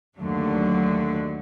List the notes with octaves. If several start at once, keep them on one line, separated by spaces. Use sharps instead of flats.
D#2 D3 F#3 A3